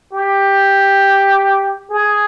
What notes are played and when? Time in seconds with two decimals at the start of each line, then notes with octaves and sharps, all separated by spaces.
0.13 G4
1.90 G#4